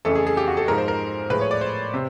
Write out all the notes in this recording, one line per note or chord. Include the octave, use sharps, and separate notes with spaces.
F2 C#3 E3 A3 A4
G#4
G#4
G4
F#4
A4
G#2 F3 G#3 A#4
C5
A#4
A2 F3 G#3 B4
C#5
D5
C5
C3